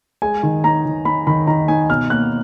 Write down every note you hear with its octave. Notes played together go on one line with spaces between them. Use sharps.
G#3 G#5
D#3
D#4 A#5
D#3
D#4 B5
D#3 B5
D#3 A#5
D#4 G#5
B2 F6
A#3 F#6